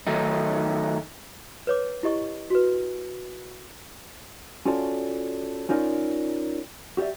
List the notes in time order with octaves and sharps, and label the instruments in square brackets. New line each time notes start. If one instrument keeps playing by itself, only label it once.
[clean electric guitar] D#3 F#3 A3 D#4
[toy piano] B4 C#5 D6
E4 G4 D#5 C#6
F#4 B4
[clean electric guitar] C#4 F4 F#4 A4 C#5 D5
C#4 D#4 F4 A#4 C#5 D5
F#4 G4 C#5 D5 E5